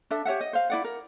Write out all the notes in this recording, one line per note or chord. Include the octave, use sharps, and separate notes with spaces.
D4 A4 E5
G4 C#5 E5 F#5
D#5
C5 F5
E4 D5 F#5
A#4